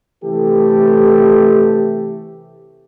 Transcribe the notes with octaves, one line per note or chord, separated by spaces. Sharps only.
C3 E3 A3 G4 A4